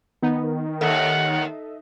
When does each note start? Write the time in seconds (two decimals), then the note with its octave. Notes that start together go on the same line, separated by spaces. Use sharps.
0.22 D#3 B3 D#4
0.81 D#2 A4 D#5 E5 F#5